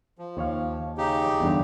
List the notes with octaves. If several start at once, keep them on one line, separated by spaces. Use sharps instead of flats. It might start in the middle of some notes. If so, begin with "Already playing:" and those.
F3
D#2 C#5 F5
C#3 D#4 G4
E2 G2 D3